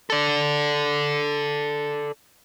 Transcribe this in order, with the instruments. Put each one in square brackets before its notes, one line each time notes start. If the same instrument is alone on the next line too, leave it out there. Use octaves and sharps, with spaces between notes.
[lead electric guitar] A4 D5